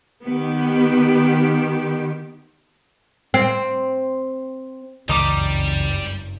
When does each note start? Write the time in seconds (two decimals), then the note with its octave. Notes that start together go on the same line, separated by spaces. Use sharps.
0.24 D#3 B3 G4
3.34 C4
5.09 F#1 C#2 G2 E3 G3 D#5 A#5 D6